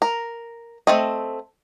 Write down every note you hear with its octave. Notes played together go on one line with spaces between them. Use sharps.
A#4
A3 C4 D#5